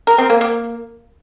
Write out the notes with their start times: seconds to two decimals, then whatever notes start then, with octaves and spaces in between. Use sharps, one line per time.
0.07 A#4
0.18 C4
0.30 A#3
0.41 A#3